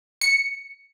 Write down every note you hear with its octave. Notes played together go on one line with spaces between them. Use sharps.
C#7